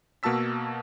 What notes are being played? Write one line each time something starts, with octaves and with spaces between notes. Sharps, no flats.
B2 A#3 F#4 A5 E6 B6